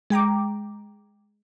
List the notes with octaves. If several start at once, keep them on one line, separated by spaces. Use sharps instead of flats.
G#3 G5 A#5 D6